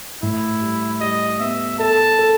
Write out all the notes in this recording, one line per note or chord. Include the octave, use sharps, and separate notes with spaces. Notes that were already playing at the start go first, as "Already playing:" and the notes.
A2 E4
G3
G3 D#5
B3 E5
A4 A5
A4